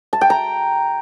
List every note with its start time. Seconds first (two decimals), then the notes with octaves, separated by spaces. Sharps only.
0.13 A5
0.21 G5
0.30 A#5